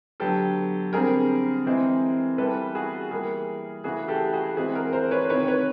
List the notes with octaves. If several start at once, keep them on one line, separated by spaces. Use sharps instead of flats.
D3 F#3 B3 G4 A4
D3 G3 C4 G#4 A#4
E3 G#3 C4
E3 G3 B3 A4 B4
F#4 G#4
E3 G3 A#3 G#4 A#4
C#3 E3 A3 F#4 G#4
G4 A4
F#4 G#4
E3 G#3 C4 F#4 G#4
G#4 A#4
A#4 C5
B4 C#5
C3 D#3 G#3 B4 C#5
B4 C#5